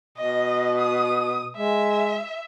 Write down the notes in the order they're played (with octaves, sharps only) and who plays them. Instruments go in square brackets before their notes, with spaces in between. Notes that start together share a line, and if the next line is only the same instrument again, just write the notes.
[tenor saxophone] B2 [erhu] D#5
[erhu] D#6
[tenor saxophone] G#3 [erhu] E5